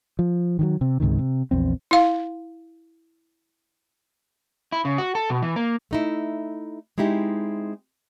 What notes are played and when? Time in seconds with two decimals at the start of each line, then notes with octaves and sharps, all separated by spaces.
0.19 F3
0.59 D#3 E3 F#3
0.81 C3
1.00 C#2 G#2 C3 D#3
1.19 C3
1.51 A#1 E2 C4
1.91 E4 F5
4.72 E4
4.85 C#3
4.98 F#4
5.15 A4
5.30 B2
5.42 E3
5.56 A#3
5.91 A3 D#4 E4
6.98 G#3 C4 D#4 E4 G4